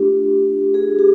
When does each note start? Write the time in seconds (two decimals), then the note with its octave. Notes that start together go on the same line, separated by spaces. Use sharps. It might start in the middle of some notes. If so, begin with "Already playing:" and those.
Already playing: A3 D4 F4 G4
0.74 G#4
0.99 G4